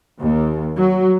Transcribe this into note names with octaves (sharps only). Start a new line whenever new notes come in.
D#2
F#3